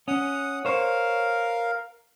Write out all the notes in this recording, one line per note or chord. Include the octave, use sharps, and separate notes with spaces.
C#4 F#5 D#6
A#4 C5 C#5 F5